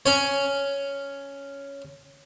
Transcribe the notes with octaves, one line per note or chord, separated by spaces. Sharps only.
C#4 C#5